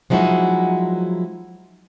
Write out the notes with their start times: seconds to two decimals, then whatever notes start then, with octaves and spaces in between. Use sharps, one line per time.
0.10 F3 F#3 G#3 D#4 E4 F#4